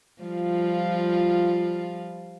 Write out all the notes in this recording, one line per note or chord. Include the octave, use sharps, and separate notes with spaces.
F3 G3 F4